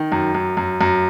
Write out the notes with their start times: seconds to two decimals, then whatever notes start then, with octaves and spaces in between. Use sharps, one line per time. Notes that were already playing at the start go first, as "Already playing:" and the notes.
Already playing: D#3
0.12 F#2
0.35 F#2
0.57 F#2
0.81 F#2